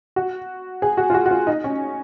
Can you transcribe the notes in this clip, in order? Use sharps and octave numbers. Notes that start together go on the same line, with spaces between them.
F#4
G#4
F#4
F4
F#4
F#4
F4
D#4
C#4